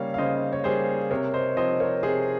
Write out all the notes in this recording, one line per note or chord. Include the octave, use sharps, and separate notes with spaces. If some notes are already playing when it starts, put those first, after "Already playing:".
Already playing: C#3 G3 A#3 A#4 C#5 F5
F5
C#3 C5 D#5
C#5
G3 A#3 G#4 C5
C3 A#4 C#5
C5 D#5
F3 C4 C5 D#5
A#4 C#5
C3 G#4 C5